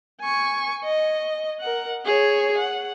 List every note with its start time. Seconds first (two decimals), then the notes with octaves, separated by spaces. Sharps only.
0.21 G#5 C#6
0.84 D#5
1.60 A#4 F#5
2.05 G#4 C#5
2.58 F#5